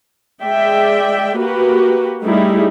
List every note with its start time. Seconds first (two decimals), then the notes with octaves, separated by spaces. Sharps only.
0.43 G#3 D5 E5 G5
1.38 A#3 F#4 G4 B4
2.21 G3 A3 D#4 E4 G#4